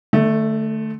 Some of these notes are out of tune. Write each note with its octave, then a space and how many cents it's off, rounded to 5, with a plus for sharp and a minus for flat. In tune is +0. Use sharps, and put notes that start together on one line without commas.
D3 +40 A3 +0